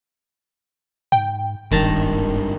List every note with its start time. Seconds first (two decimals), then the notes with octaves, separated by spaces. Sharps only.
1.12 G#2 G5
1.72 D#1 G#1 G2 D#3 A5 A#5